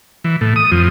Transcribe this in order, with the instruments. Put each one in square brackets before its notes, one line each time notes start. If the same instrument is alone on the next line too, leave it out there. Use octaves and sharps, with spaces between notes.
[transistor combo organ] E3
A2
D#6
F2